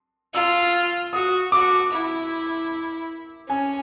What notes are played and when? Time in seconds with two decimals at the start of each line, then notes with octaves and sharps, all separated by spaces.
0.34 F4 E6
1.13 F#4 D#6
1.52 F#4 D6
1.92 E4
3.49 C#4 G#5